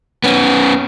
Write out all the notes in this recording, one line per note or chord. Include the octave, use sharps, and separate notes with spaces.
B3 C#4